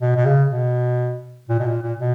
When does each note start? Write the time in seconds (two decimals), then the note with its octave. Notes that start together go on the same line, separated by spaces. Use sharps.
0.01 B2
0.16 B2
0.25 C#3
0.50 B2
1.49 A#2
1.59 B2
1.66 A#2
1.82 A#2
1.99 B2